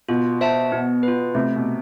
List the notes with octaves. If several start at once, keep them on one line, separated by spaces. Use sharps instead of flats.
B2 F4
C5 E5 A5
B2 B3
F4 B4
C3 A3
B2